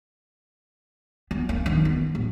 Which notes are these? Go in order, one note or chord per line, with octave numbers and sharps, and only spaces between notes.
B3
A#3
D#3
B3
A1